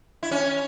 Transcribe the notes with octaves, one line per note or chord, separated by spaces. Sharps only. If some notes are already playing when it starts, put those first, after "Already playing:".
E4
C#4